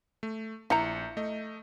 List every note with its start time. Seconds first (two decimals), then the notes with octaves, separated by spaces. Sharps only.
0.23 A3
0.70 A#1 E4 A#5 G6 C#7
1.17 A3 D#5